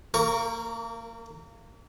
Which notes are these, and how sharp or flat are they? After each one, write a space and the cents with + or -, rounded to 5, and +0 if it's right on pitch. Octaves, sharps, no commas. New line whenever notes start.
A#3 -30 A#4 +0 C#6 +10